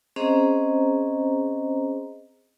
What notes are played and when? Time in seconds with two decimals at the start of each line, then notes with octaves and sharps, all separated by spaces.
0.16 C4 C#4 G#4 C5 D#5 A#5